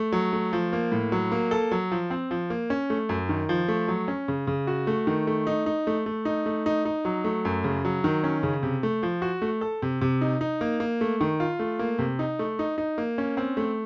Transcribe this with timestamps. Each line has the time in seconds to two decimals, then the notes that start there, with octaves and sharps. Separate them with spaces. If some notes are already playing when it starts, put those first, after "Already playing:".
Already playing: A3
0.12 F#3
0.33 A3
0.53 F3
0.73 A#3
0.92 A2
1.12 F#3
1.32 A#3
1.51 A4
1.71 F#3
1.92 F3
2.10 C4
2.31 F3
2.50 A#3
2.70 C#4
2.90 A3
3.09 F#2
3.29 D#3
3.49 F3
3.68 A3
3.88 F#3
4.08 C#4
4.28 C#3
4.47 C#3
4.67 F#4
4.87 A3
5.07 D#3
5.27 A3
5.47 D#4
5.66 D#4
5.87 A3
6.06 A3
6.25 D#4
6.46 A3
6.66 D#4
6.85 D#4
7.05 F#3
7.24 A3
7.45 F#2
7.64 C#3
7.85 F#3
8.04 D#3
8.24 C#4
8.43 C#3
8.63 C3
8.83 A3
9.03 F3
9.22 F#4
9.42 A3
9.61 A4
9.82 C3
10.01 C3
10.21 D#4
10.41 D#4
10.61 A#3
10.80 A#3
11.01 A3
11.21 D#3
11.40 F4
11.59 A3
11.79 A#3
11.99 C3
12.19 D#4
12.39 A3
12.59 D#4
12.78 D#4
12.98 A#3
13.18 C#4
13.37 C4
13.57 A3